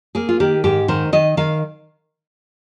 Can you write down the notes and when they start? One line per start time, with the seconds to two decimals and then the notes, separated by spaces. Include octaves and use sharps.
0.15 A#3 G#4
0.29 F4
0.40 D#3 G4
0.64 G#2 G4
0.88 D#3 C5
1.13 D#3 D#5
1.37 D#3 F5